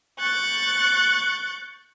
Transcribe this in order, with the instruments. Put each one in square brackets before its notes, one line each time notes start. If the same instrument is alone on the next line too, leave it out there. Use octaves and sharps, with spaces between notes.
[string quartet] C#6 F#6 G6 A6